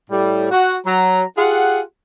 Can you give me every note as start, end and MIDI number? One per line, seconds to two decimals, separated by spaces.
0.10 0.47 45
0.10 0.47 55
0.51 0.76 66
0.86 1.23 54
0.86 1.23 82
1.38 1.80 65
1.38 1.80 67
1.38 1.80 68
1.38 1.80 78